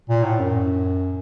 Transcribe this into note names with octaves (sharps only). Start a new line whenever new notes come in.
A#2
A2
F#2